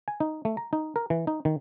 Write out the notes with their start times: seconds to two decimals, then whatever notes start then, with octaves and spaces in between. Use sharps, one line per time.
0.08 G#5
0.20 D#4
0.45 A3
0.57 A#5
0.73 D#4
0.96 A#4
1.10 E3
1.27 D#4
1.45 D#3